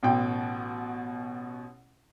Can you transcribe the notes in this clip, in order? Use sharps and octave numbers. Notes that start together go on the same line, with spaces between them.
A1 B2 G5